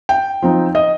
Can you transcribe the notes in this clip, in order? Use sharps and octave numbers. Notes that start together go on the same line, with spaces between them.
G5
F3 C4 D#4
D#5